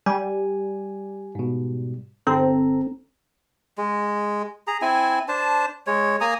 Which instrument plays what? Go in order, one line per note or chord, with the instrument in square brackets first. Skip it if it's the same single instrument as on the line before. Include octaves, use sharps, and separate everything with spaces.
[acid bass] G3 [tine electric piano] G#5
[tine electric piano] G#2 B2
[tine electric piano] G1 A4 A#5 [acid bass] C4
[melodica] G#3
G#4 A#5
C4 E4 G#5
D4 C5 A5
G#3 C#5
A#3 G#5 A#5 D#6